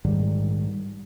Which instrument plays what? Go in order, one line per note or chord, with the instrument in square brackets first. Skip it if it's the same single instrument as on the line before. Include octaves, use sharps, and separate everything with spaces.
[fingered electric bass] A#1 G#2 D#3 G3